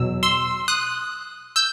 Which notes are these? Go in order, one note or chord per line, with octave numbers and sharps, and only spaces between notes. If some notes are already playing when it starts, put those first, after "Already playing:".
Already playing: E2 B2 F#3 E6
C6 E6
D#6 F#6
E6 G6